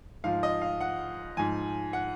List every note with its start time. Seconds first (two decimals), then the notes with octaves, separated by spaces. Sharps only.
0.24 G#2 F3 F5
0.43 D#5
0.62 F5
0.81 F#5
1.37 G#2 F3 G#5
1.93 F#5